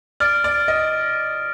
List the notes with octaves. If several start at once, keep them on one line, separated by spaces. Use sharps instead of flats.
D5 F6 A6 D7
D5
D#5